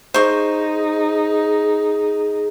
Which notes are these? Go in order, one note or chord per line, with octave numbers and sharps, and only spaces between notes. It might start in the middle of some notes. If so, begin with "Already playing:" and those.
D#4 G#4 C5 C#6